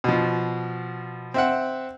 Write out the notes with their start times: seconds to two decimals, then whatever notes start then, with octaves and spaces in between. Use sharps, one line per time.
0.04 B2 F3
1.34 C4 E5 F#5